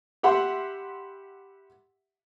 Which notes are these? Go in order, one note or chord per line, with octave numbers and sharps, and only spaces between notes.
G4 E5 F#5 B5 C6